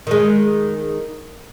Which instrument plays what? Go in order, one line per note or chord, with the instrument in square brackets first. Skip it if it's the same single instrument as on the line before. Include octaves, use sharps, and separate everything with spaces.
[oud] D#3 G#3